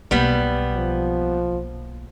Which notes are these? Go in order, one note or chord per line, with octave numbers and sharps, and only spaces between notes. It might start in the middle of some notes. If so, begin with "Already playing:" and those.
B1 G3 A#3 B3
F3